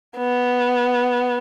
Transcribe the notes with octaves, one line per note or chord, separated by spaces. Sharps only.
B3